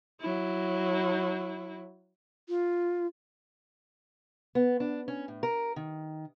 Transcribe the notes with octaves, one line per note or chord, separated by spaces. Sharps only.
F#3 E4
F4
B3
D4
C#4
A2
A#4
D#3